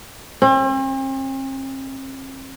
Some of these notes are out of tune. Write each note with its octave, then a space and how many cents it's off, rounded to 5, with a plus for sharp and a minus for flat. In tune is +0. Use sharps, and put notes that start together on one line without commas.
C4 +45